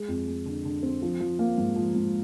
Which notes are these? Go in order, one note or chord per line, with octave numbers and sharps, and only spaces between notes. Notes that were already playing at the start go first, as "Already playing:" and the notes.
Already playing: G#3
F2
G#3
D3
D3
C4
F3
F3
A#3
G#2
F3
G#2